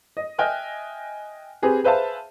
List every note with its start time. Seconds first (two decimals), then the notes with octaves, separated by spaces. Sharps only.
0.17 D#5
0.38 D#5 E5 G5 G#5 F6 F#6
1.62 C4 G4 G#4 B4
1.84 G#4 B4 C5 E5 F5 A5